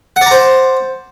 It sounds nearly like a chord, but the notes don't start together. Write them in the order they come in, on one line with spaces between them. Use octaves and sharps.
F#5 D5 A#5 C5